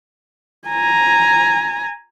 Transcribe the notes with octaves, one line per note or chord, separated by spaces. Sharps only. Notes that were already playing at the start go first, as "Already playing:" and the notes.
G#5 A#5